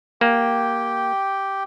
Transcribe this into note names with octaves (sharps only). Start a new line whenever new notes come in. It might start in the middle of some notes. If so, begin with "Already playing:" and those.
A#3 G4 G5